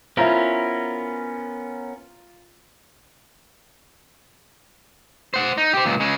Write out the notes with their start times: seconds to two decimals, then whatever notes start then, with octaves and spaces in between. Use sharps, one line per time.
0.17 B3 C#4 E4 F4 A#4 C5 A#5
5.34 C5 F#5
5.58 D#4
5.73 G4 C5
5.85 C#2 A#2
6.00 C#3 G#3